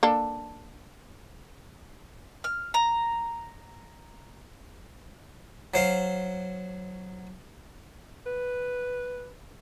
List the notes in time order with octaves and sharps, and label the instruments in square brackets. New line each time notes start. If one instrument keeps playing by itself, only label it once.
[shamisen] A#3 D4 A4
[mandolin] F6
A#5
[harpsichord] F#3 C5 F5
[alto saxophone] B4